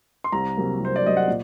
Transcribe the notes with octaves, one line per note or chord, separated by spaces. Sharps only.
C6
C2 A#5
C3 F#3 A#3
C2 C5
D5
C3 F#3 A#3 D#5
F#5
A#2